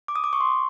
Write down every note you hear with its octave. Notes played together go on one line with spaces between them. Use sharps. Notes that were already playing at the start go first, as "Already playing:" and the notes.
D6
D#6
D6
C#6
C6